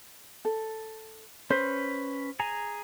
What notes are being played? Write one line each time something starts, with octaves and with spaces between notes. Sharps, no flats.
A4
C#4 B4 C5
G#4 G#5 A#5